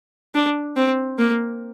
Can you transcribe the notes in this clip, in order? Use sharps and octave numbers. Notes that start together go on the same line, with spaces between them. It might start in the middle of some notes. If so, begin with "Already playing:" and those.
D4
C4
A#3